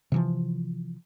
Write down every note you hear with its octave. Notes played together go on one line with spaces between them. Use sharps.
C3 E3 F3